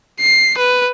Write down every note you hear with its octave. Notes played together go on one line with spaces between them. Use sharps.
C7
B4